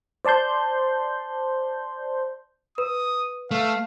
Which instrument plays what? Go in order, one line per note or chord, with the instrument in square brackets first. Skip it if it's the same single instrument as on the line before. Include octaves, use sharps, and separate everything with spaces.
[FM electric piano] C5 D5 A5 C6 G6
[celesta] B4 [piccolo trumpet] D#6
[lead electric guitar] A3 [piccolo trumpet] F5